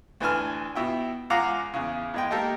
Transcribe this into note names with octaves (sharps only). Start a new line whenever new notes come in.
D2 E3 D4 G#5 F6
B2 E4 G5
C#2 F4 F5 F#5 A#5 D6
E2 C#3
E2 G#3 G5
A#3 D#4 G4 A4 A#4